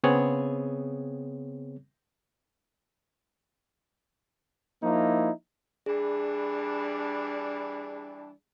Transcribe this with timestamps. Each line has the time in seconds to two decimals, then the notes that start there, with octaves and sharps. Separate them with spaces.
0.04 C#3 B3 C4 G#4 C#5
4.83 F3 A#3 D#4 E4
5.86 E3 G3 D4 G#4